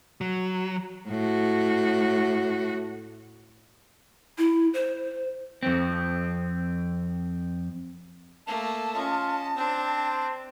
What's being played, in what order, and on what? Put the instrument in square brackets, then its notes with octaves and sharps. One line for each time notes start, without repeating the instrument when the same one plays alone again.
[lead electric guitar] F#3
[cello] A2 F#4
[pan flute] E4
C5
[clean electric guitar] F2 C4
[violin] A3 A#3 [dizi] A5
[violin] C#4 [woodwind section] F4 D#5
[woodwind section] C4 [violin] D4